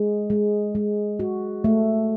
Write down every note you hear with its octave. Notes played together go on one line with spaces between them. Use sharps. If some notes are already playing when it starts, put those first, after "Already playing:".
Already playing: G#3
G#3
G#3
F#4
A3